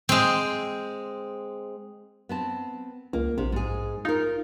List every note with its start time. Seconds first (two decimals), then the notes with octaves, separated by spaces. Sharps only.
0.09 G#3 C4
2.29 B3 C4 A5
3.13 C#2 A#3
3.38 A#1 C3
3.52 G#2 G#4
4.05 D#4 F4 A#4